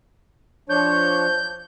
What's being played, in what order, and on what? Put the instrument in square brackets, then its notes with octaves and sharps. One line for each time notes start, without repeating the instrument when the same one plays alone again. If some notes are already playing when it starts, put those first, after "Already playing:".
[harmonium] F3 D4 C#5 [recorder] G6